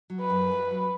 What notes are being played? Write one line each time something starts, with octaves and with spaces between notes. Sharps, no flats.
F#3
B4
F#2
F#3
F#3